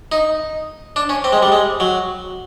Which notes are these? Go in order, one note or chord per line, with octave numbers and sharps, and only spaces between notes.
D#4
D4
C#4
C4
G#3
G3
G#3
F#3